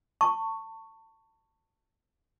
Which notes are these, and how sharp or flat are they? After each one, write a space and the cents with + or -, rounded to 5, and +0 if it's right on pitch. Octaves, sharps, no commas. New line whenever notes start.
A5 +30 C#6 +0